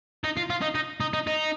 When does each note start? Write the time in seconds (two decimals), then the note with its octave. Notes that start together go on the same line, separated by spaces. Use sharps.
0.24 D#4
0.37 F4
0.50 F4
0.62 D#4
0.75 D#4
1.00 D#4
1.13 D#4
1.27 D#4